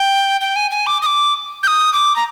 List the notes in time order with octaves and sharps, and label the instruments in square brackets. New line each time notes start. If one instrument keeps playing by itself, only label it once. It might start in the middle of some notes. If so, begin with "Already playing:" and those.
Already playing: [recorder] G5
G5
G#5
G#5
D6
D#6
D6
G6
D#6
D6
A#5